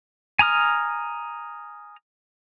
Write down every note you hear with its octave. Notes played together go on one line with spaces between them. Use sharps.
G#5 A#5 D#6 F6